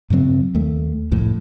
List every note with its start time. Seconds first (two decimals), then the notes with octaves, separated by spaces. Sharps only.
0.10 G2 C#3 F#3 C4
0.55 D#2 A3
1.11 C2 F2 A2